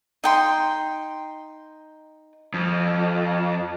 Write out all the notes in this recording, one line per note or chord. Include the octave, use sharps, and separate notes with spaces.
D#4 G5 C6
F2